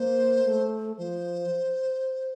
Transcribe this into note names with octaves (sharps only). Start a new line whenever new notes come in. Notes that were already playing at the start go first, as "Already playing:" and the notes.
Already playing: A#3 C5
A3
F3 C5